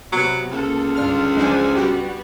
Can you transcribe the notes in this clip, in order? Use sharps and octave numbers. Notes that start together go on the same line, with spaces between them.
C3 F#3 B3
C#2 A#3 A4
G1 D4 F4 F6
F3 G#3 D4 C5 D5 G#5
G2 G3 B3 F#4 G4